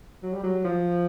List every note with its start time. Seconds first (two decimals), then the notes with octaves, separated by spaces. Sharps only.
0.23 F#3
0.33 G3
0.43 F#3
0.65 F3